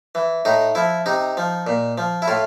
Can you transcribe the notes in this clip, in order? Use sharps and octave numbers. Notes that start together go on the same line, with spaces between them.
E3
A2 D#4
F3 E4
C3 D#4
F3
A#2
F3
E4
A2 F4